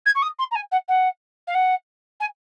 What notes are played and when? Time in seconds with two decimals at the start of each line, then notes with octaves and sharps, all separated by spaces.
0.06 G#6
0.15 C#6
0.22 D#6
0.39 C6
0.51 A#5
0.55 G#5
0.72 F#5
0.88 F#5
1.47 F5
1.55 F#5
2.20 G#5